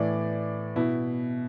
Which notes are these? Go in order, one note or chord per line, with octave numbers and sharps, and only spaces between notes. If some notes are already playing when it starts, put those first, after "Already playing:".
Already playing: A2 E3 D5
B2 E4